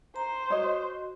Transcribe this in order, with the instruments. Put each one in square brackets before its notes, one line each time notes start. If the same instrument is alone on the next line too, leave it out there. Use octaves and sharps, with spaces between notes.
[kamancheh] C5 [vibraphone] A#5
[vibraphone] F#4 [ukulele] C#5 D#5